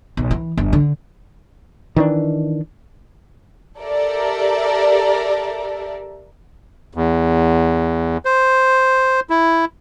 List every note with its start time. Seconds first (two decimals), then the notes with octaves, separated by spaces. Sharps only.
0.17 B1
0.31 E3
0.57 G1
0.73 D3
1.96 D#3 E3 D4
3.79 G4 A4 A#4 D5 E5
6.94 E2
8.25 C5
9.30 E4